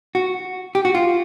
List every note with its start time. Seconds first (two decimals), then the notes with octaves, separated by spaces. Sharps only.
0.15 F#4
0.75 G4
0.85 F#4
0.95 F4